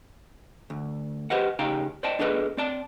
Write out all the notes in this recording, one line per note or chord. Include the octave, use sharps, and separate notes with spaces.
D2
G4 B4 C5 D#5 F#5
C#3 D#4 G4 F5 G5 A#5
C5 D5 D#5 G5 A5
B3 D4 G#4 A4 B4 D#5
C4 D5 A5